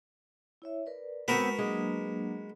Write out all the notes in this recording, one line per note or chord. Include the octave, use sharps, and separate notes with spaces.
E4 C#5 E5
A#4 B4 D5
G#3 B3 C4 F#4 A#4 B4
F#3 G#3 A#3 D4